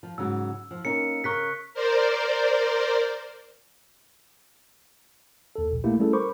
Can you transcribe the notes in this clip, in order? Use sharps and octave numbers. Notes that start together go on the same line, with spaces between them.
F3
G#2 C#3 F#3 E6
F3
A#3 C#4 D#4 C#7
C#3 A#4 C#6 F#6 B6
A#4 C5 D5
D#2 A4
A#1 A#2
A3 A#3 E4 G4
G3 A3 C#4 E4 G#4 A4
A#4 C5 B5 C#6 D6